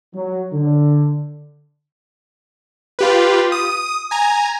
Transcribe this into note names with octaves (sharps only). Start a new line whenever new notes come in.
F#3
D3
F4 G4 B4
D#6
G#5 A#5